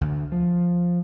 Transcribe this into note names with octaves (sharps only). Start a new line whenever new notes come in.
D2
F3